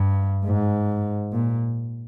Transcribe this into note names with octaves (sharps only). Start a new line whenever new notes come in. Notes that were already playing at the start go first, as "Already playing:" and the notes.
Already playing: G2
G#2
A#2